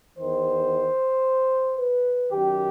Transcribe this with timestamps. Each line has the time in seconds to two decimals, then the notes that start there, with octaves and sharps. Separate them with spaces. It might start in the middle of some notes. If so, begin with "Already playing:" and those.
0.18 E2 D#3 C5
1.79 B4
2.32 F#2 D#3 G4